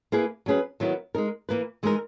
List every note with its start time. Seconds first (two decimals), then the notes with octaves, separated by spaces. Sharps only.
0.12 A#3 E4 G#4 B4
0.46 F#3 C#4 G#4 B4
0.80 D#3 F#3 B3 E4 A#4
1.15 G#3 D#4 A#4
1.49 E3 A#3 E4 B4
1.83 E3 G#3 D#4 A#4